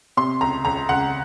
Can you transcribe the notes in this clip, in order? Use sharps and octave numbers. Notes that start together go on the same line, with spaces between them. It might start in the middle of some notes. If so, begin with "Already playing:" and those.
C3 C6
C#2 A#5
C#2 A#5
C#2 F#5